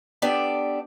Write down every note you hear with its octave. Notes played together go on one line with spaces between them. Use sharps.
B3 D4 G4 A4 D5